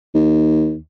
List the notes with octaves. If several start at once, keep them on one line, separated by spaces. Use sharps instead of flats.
D#2